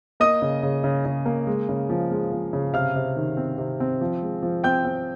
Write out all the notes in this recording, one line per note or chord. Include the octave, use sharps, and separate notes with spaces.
A#3 D#5 D#6
C#3
C#3
C#3
C#3
A#3
G#3
C#3
F3
G#3
F3
C#3
C3 F5 F6
C3
D#3
C4
C3
C4
F3
G#3
F3
C4 G5 G6
C4